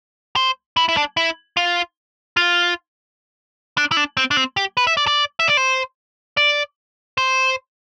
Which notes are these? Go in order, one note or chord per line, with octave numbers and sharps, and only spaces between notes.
C5
E4
E4
D4
E4
F4
F4
D4
E4
D4
C4
D4
C4
G4
B4
E5
D5
D5
E5
D5
C5
D5
C5